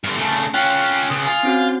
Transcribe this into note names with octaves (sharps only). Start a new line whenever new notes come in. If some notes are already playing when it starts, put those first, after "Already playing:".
G2 D3
C#3 A3
C#4 F4 G5 F#6
C#2 D#6
F4 G#5
C4 C#4 F#4